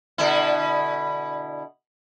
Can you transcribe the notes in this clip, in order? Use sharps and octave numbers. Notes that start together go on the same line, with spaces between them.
B2 D3 E4